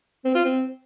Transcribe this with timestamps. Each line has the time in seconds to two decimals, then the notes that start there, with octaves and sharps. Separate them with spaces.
0.25 C4
0.35 F4
0.45 C4